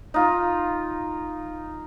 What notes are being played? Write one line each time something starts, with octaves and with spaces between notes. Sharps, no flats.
D#4 F4